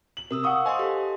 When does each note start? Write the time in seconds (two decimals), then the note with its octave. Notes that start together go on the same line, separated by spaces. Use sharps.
0.17 F#7
0.31 C3 A#4 D#6 E6
0.43 F5 F#5 C#6 D#6 E6
0.66 C5 D#5 G#5 C6
0.79 G4 A4 D#5